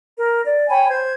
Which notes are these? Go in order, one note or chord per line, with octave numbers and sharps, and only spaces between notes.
A#4
D5
C#5 G5 G#5 B5
C5 G#6